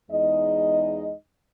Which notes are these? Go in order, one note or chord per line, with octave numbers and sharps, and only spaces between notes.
E2 G#3 D#4 D#5